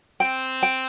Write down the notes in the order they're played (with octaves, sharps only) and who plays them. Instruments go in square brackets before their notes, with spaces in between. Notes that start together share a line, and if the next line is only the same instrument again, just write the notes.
[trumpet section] C4 [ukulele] G5
[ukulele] G5